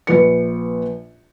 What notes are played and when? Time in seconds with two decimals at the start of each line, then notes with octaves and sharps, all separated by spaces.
0.07 A#1 B4 C#7